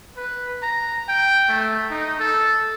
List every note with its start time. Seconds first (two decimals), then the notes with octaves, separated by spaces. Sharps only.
0.16 B4
0.62 A#5
1.08 G5
1.48 A3
1.90 D#4
2.19 A4